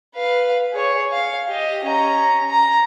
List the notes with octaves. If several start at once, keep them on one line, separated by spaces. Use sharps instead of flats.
B4 F5
G#4 C#5
F5
G4 D#5
C#4 A#5
A#5